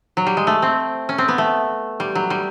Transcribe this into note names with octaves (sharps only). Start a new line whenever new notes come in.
F#3
G3
G#3
A3
C4
C#4
C4
B3
A3
G3
F#3
G3